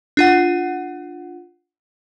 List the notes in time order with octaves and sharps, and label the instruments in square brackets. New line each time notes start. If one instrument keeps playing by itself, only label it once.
[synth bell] D4 F4 F#5